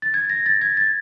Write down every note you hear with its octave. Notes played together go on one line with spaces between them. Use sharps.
A6
G#6
A#6
A6
G#6
A6